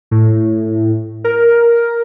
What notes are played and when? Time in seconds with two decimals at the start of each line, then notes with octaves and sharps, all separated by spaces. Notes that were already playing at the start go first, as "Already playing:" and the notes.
0.11 A2
1.24 A#4